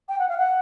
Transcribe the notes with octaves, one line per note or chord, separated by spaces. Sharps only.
G5
F#5
F5
F#5